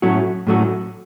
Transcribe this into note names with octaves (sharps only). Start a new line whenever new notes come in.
A2 F#3 A3 C#4 F#4
A2 F#3 A3 C#4 F#4